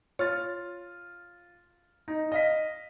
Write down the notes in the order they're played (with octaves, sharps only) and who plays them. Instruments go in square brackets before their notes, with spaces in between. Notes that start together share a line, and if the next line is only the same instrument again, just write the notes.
[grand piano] F4 F6 A6 [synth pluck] C#5
[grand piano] D#4
D#5 F5 B6